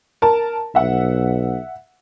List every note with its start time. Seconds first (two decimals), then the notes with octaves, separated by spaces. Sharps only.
0.22 A#4 A5
0.75 B1 E5 F#5